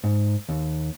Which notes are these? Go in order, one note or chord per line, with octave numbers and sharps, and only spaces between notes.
G#2
D#2